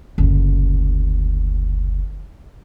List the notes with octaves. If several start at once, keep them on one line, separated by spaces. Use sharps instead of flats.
F#1 D2